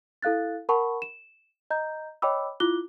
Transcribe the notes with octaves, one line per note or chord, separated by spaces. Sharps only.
E4 A4 F5 F#6 A6
A#4 F#5 A5 B5 C#6
E7
D#5 A#5 G6
C#5 D#5 G5 B5 D6 E6
E4 F4 D6 F#6 G7